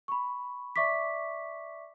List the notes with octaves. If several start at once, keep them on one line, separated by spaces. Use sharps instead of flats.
B5 C#6
D5 E5 C#6 D6 B6